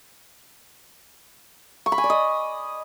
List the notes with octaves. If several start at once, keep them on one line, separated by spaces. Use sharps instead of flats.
C#6
B5
G#5
D5
D#5